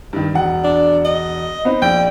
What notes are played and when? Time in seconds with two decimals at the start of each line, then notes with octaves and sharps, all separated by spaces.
0.13 G2 D#3
0.34 E1 F#5
0.64 D4
1.05 D#5
1.65 B3 C4 D#4
1.82 A#1 G5